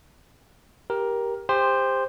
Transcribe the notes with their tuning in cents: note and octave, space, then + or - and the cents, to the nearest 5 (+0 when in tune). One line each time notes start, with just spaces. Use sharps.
G4 +0 A#4 +15
G4 +30 C5 +0